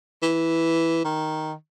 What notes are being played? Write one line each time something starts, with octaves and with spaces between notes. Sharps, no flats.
E3
D#3